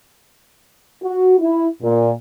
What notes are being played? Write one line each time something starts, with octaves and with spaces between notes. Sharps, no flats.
F#4
E4
A#2